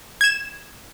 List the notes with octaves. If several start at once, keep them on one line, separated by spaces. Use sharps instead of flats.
G#6 E7